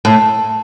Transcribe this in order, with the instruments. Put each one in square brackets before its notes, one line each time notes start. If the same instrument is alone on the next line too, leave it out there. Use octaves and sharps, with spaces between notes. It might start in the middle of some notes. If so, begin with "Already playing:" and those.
[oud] A2